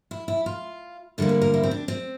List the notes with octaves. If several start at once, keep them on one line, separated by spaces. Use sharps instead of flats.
E4
E4
F4
D2 D3 G3 A#3 E4
E4
A#4
E4
C4
D4
C4